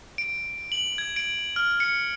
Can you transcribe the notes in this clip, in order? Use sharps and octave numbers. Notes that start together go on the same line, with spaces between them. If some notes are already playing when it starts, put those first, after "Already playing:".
D7
F#7
G#6
D7
F6
C#7